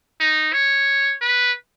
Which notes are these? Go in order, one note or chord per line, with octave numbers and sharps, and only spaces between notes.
D#4
C#5
B4